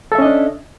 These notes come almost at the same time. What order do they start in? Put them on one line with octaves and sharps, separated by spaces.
A4 E5 C#4 D#5 D4